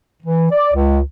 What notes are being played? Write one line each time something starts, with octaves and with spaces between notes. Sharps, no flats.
E3
D5
C#2